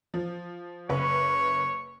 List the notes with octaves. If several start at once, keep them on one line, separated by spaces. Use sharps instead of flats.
F3
F#1 B4 C#5 C#6